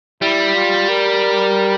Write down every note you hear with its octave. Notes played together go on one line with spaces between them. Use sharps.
G3 E4
F4
A#4